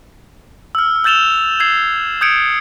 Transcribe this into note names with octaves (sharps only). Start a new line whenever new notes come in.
E6 F6
E6 G6 A6 E7 F7 G7
E6 G#6 C7 E7
D#6 G6 G#6 C#7 D7